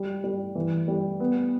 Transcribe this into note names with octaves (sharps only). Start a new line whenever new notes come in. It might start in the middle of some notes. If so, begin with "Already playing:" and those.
Already playing: G3
G3
E3
G3
B3